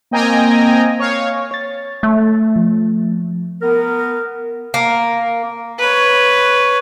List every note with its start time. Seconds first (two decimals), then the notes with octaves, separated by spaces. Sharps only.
0.11 A#3 C4 D#5 G5 G#5 A#5
1.00 C#5 F5
1.51 C#5 A6
2.03 A3
2.56 F3
3.62 B3 A#4
4.74 A#3
5.79 B4 C#5